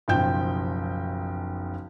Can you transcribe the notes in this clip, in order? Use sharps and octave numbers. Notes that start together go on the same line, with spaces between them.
F#1 B1 F3 G5 G6